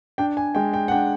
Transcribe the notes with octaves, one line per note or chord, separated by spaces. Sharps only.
D4 G5
G#5
G#3 G5
G5
F#5
D4 G5